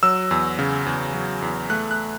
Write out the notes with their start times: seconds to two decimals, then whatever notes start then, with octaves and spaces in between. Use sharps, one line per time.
0.03 F#3 E6
0.31 E2
0.59 C#3
0.86 E2
1.14 F#3
1.42 E2
1.70 A3 F#6
1.91 F#6